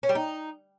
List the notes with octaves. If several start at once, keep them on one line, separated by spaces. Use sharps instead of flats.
C#4
G3
D#4